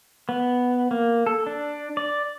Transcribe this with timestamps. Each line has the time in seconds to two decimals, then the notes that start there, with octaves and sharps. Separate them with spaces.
0.29 B3
0.91 A#3
1.26 A4
1.47 D4
1.97 D5